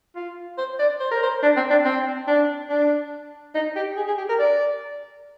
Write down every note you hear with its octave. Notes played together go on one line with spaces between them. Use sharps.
F4
C5
D5
C5
A#4
C5
D4
C4
D4
C4
D4
D4
D#4
G4
G#4
G#4
G4
A#4
D5